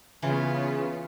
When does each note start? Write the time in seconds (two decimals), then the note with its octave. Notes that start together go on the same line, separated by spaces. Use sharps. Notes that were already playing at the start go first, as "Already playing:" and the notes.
0.22 C#3 E3 B3 F4